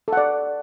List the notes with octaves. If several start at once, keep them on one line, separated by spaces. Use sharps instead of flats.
A4 D5 F#5